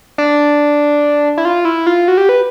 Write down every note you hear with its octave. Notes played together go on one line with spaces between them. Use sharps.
D4
E4
F4
E4
F4
F#4
G4
B4